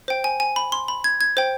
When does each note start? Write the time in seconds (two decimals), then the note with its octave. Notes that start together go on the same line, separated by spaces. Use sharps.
0.08 C5 G5
0.24 G#5
0.40 G#5
0.56 B5
0.72 C6
0.88 B5
1.04 G#6
1.21 G#6
1.37 C5 G5